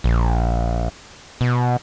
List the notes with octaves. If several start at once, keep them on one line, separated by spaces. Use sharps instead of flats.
A#1
B2